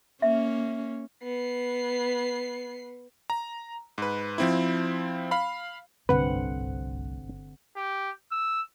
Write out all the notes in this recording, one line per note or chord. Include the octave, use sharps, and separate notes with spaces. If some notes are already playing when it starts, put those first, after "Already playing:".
A#3 C#4 E5
B3 C7
A#5
G#2 B4
F3 C4 E4
F5 B5
G1 C2 A2 D3 C4 B4 F#5
G4
E6